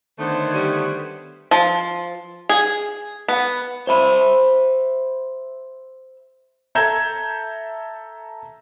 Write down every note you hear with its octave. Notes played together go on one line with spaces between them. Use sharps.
D3 D#3 A3 B3 C5 C#5
G3
F3
G#4
B3
C5 E5 B5
A4 E5 A#5 G6 G#6 E7